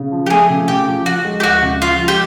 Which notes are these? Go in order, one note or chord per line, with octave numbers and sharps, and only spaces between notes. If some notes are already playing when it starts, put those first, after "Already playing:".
Already playing: C#3
F3
G4
A3 G#4
C#3
C#3 G4
F3
F3 F#4
G#3
G4
D2 F#4
C#3
F3 F4
G#3
G4